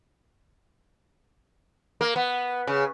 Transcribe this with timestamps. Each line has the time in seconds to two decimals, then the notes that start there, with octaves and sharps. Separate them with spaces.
2.01 A#3
2.16 B3
2.67 C#3